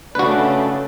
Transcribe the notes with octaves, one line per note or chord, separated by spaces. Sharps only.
C#3 A3 D4 F#4 B4